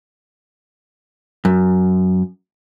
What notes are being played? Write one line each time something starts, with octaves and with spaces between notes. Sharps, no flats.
F#2